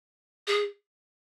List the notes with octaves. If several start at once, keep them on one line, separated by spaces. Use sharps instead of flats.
G#4